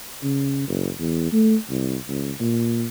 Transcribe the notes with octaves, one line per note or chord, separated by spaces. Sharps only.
C#3
F#1
E2
A3
C2
C#2
A#2